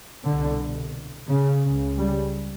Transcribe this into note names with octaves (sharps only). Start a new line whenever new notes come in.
C2 B2 D3
C#3
C#2 C#3
G3